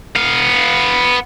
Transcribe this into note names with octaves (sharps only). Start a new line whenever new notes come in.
B3 F5